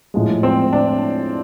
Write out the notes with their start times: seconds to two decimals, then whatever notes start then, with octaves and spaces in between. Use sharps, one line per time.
0.14 A2 F3 G#3
0.43 C4
0.73 D4